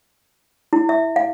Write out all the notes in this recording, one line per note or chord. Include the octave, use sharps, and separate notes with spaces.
E4
E5
F5